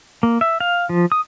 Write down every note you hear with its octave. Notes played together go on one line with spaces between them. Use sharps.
A#3
E5
F5
F3
D#6